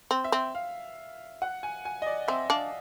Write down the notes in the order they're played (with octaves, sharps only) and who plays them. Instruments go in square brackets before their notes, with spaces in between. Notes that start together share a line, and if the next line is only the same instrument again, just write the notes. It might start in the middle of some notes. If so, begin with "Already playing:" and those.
[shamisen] C4
[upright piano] E5
[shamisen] C4
[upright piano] F5
F#5
G#5
G#5
D#5
D5
[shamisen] C4 [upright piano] E5
[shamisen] D4 [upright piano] F5